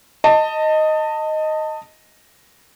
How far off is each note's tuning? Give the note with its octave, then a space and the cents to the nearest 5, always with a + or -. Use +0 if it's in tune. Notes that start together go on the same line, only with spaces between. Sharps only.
D#5 +0 A5 +25